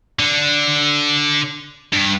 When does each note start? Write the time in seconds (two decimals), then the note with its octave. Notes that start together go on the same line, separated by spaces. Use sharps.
0.19 D3
1.93 G2